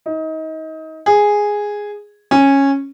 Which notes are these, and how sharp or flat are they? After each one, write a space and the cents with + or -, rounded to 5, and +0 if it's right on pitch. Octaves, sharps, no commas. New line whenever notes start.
D#4 +30
G#4 -5
C#4 -10